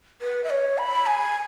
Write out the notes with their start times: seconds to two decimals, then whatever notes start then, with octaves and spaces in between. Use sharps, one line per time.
0.22 B4
0.44 E5
0.50 C#5
0.78 B5
1.06 G#5